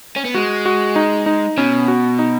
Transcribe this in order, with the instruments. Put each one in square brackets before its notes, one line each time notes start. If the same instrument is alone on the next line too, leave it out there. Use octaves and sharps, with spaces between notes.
[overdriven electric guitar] C#4
B3
[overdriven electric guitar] G#3 [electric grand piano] F#4
[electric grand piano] F#4
D#4
D#4
[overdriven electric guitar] B2 [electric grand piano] C#4
[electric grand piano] F#4
D#4